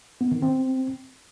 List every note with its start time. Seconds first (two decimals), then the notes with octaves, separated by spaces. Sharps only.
0.21 B3
0.32 D#3
0.42 C4